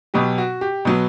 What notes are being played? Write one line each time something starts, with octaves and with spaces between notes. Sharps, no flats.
B2 F#3 B3 G4
F#4
G4
B2 F#3 B3